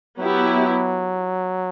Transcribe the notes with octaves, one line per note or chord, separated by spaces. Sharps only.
F#3 B3 E4 G4